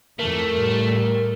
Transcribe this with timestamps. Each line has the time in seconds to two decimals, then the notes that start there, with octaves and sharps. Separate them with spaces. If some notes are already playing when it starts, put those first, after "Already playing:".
0.19 F2 E3 A3 A#4
0.56 A2 G3